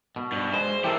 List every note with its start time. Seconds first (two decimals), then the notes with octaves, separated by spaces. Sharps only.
0.16 B2
0.32 G2
0.54 G#3 C5
0.84 E3 A#3 G4 A4 F5